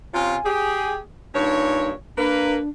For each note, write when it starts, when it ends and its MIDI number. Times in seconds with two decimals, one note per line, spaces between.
0.14 0.36 48
0.14 0.36 61
0.14 0.36 65
0.14 0.94 80
0.45 1.01 67
0.45 1.01 68
1.35 1.93 43
1.35 1.93 46
1.35 1.88 63
1.35 1.93 73
2.17 2.58 58
2.17 2.69 62
2.17 2.58 71